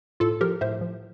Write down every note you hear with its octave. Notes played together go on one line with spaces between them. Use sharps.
A2 F4 A4
F3 G4 A#4
A2 C5 E5
F3